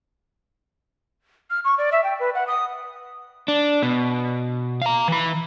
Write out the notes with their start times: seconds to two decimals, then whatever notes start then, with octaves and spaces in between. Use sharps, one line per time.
1.50 F6
1.65 C#6
1.78 D5
1.92 E5
2.04 G5
2.20 B4
2.35 F#5
2.47 D#6
3.48 D4
3.83 B2
4.82 F5 A#5
5.08 E3 B5